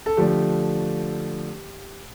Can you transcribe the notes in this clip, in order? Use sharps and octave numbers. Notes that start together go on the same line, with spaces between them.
A4
D3 F3 A3 G4